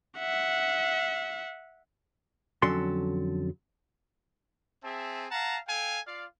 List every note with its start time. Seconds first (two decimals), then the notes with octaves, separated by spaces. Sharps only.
0.20 E5 F#5
2.62 F2 D3 F#3 C#4 A4 C6
4.83 C4 G#4 E5 A5
5.31 F5 F#5 A5 A#5
5.67 A4 F5 G5 G#5
6.06 F4 D5 F5